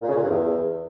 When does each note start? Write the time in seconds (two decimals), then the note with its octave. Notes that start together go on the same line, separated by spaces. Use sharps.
0.02 A#2
0.08 C#3
0.15 A#2
0.22 G2
0.29 E2